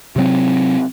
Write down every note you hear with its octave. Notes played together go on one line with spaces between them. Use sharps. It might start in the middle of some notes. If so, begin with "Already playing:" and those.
C3 F#3 C4